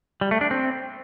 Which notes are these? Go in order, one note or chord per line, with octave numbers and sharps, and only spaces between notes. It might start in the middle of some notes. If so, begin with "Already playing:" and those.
G3
A3
D4
C4